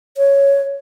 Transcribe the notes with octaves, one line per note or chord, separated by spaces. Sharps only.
C#5